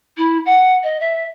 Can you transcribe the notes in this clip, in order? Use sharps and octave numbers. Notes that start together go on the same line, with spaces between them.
E4
F#5
D#5
E5